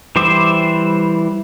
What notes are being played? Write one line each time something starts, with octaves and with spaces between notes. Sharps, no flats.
E3 G3 C5 E5 D6